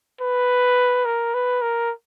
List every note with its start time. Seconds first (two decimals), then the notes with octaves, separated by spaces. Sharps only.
0.21 B4
1.05 A#4
1.34 B4
1.62 A#4